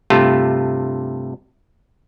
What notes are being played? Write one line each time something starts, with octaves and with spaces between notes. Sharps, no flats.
G2 C3 A3 F4